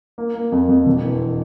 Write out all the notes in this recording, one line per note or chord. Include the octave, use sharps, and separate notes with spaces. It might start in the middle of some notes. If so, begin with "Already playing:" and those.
A#3
A#3
F2
F2
E1
E3